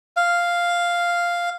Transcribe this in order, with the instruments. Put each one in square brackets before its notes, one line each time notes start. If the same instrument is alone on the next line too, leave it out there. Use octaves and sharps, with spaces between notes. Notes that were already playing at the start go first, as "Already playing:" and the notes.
[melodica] F5